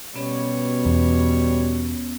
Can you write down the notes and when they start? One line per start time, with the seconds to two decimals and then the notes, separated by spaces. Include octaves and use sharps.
0.16 B2 G3 B3 C#4 C#5
0.85 E2